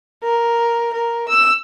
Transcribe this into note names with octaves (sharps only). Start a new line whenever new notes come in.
A#4
A#4
E6